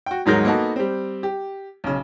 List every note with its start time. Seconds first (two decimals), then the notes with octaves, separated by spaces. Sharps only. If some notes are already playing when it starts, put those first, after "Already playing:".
0.06 F#4 G5
0.26 D#1 G#2 F#3 G#3 A#4 G6
0.45 A#3 B3 D#4 F#4 A4
0.76 G3 C4
1.23 G4
1.84 B1 C#3